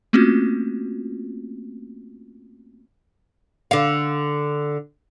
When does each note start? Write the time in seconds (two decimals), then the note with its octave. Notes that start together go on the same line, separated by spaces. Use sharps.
0.13 A3 A#3 C4 C#4 F4 F#4
3.71 D3 F5